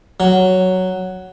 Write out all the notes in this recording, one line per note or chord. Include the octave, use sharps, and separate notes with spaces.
F#3